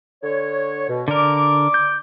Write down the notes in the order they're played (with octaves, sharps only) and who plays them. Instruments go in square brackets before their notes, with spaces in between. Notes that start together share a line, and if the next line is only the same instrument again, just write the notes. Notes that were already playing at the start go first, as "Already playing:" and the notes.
[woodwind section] D3 C#5
B2
[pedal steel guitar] D3 A#4 [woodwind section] D5 D6
[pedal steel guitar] G6